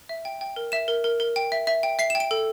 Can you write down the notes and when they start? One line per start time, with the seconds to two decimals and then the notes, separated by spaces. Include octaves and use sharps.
0.09 E5
0.25 G5
0.41 G5
0.56 A#4
0.72 E5 E7
0.88 A#4
1.04 A#4
1.20 A#4
1.36 G5
1.52 E5
1.67 E5
1.83 G5
1.99 E5 C7
2.10 E7
2.15 G5
2.20 D7
2.31 A4